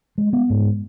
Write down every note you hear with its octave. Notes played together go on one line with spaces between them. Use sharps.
G#3
B3
G#2